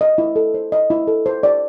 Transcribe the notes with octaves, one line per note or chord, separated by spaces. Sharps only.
D#5
E4
A4
C5
D#5
E4
A4
C5
D5